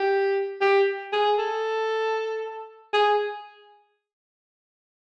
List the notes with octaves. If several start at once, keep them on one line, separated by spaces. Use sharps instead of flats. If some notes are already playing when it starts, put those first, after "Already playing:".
Already playing: G4
G4
G#4
A4
G#4